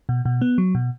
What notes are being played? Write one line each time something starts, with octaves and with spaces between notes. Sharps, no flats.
B2
B2
B3
F#3
B2